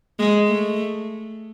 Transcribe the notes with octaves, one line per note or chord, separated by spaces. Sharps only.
G#3
A3